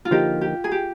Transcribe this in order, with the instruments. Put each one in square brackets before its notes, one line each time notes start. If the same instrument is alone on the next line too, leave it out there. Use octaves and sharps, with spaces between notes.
[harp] F4
[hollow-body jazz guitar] D3 F3 A#3 D#4 [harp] G4
[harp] G4
G#4
G4